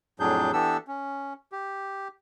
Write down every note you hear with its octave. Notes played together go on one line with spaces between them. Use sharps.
F2 A2 F#3 D4 G#4 G6
E3 B3 D4 G4 A4 E6
C#4
G4